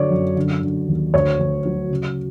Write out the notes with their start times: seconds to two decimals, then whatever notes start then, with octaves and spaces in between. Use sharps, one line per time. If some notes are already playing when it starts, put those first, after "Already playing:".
Already playing: D3 F#3 C#5 D5
0.11 F#2
0.36 D3
0.62 D3
0.88 D#2
1.14 D2 C#5
1.39 D2
1.65 F#3
1.90 C#3